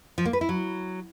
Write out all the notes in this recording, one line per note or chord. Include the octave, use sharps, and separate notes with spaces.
F3
A#3
B4
E4
F#3